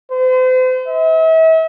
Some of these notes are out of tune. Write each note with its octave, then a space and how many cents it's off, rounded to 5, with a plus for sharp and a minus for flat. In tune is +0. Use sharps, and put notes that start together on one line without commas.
C5 -40
E5 -40